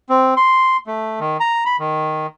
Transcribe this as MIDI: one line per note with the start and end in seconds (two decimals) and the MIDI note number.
0.09 0.34 60
0.37 0.77 84
0.87 1.20 57
1.20 1.37 51
1.40 1.64 82
1.65 1.76 83
1.79 2.26 51